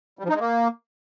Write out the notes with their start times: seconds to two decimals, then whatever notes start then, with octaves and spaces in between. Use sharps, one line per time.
0.19 G3
0.24 F3
0.29 D#4
0.35 G#3
0.40 A#3